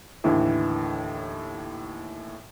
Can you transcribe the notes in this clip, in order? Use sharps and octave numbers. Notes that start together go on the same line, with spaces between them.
D#2 A2 D3 E3